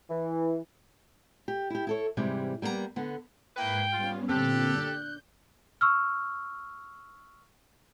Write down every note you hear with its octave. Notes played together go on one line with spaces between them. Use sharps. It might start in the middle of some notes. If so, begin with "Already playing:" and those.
E3
G4
E4 G4
E4 A4 C#5
G#2 C3 E3 G3 G#3
G3 A#3 B3 E4 A#5
D3 B3
G#2 A#3 E4 B4 G5 G#6 C7
G3 B3 C#4 F4
A#2 D3 C4 G4 A4 F#6
D4 D5 G6
C#6 E6 F6